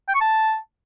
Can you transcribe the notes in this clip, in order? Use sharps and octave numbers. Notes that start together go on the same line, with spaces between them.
G5
C#6
A5